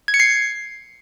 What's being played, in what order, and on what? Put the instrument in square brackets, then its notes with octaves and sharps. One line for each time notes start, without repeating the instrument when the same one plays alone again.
[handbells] G#6
C#7
C7